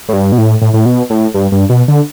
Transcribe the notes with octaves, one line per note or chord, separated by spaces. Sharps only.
A2
G2
B2
A2
A2
A2
B2
A2
G2
G2
B2
D3